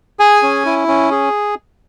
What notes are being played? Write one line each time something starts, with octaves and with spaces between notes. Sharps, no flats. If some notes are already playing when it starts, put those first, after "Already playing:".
G#4 G#5
C#4
E4
C#4
G#4